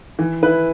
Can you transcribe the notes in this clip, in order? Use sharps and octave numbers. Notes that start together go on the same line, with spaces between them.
E3
E4 B4